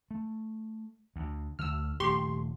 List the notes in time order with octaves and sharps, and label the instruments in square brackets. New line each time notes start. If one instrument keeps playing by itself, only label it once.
[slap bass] A3
D2
[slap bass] D2 D3 A3 [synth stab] E6 F6
[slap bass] D#1 A3 [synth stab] G4 C6 C#6